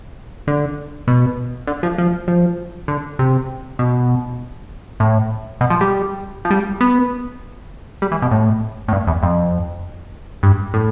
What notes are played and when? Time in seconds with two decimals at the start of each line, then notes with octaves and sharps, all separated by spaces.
0.47 D3
1.08 B2
1.67 D3
1.83 F3
1.98 F3
2.28 F3
2.88 D3
3.19 C3
3.79 B2
5.00 A2
5.61 B2
5.70 F3
5.81 G3
6.45 F3
6.50 G3
6.80 B3
8.02 G3
8.11 E3
8.22 B2
8.31 A2
8.88 A2
8.93 G2
9.07 E2
9.23 F2
10.43 G2
10.74 A2